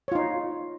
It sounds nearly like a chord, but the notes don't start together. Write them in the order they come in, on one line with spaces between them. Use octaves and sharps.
C#5 F4 D#4